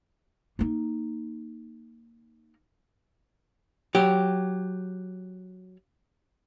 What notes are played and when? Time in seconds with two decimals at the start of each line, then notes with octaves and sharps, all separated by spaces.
0.59 A#3 D#4
3.95 F#3 G4